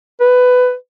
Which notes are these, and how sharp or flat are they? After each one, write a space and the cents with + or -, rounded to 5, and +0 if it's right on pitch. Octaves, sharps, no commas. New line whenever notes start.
B4 +15